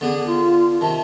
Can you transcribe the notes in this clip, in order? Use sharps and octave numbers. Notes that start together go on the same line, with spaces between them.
D3 B3 D4 G#4
F4
C3 D#3 A5